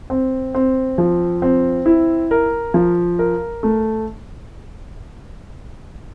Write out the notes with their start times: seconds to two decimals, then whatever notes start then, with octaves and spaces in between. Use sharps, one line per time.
0.10 C4
0.55 C4
0.98 F3
1.42 C4
1.86 E4
2.31 A#4
2.74 F3
3.19 A#4
3.63 A3